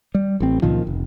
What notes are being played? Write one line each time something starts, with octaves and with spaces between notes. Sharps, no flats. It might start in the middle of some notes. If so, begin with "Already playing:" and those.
G3
A1 C4
C#2 A#2 D#3 F3
F1